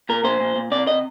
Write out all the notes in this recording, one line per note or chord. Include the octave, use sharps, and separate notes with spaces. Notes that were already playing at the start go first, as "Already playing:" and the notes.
A#2 A#4
A#2 C5
A#2
A#2
C3 D5
C3 D#5